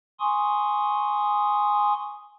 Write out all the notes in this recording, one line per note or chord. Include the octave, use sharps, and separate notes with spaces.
G#5 C6 C#6 D#6